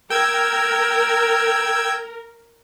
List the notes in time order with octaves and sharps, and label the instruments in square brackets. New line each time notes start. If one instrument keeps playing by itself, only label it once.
[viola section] A#4 [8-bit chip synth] G5 E6 G#6